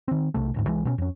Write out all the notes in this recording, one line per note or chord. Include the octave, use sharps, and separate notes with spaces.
D#3 C4
B1 C3 A3
D1 D2 G#2
C2 E3 G#3
B2 G#3 C#4
F2 C#4